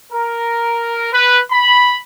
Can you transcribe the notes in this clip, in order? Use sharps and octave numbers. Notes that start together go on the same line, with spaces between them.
A#4
B4
B5